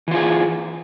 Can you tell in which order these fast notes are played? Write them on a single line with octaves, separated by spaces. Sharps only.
E3 F4 G#4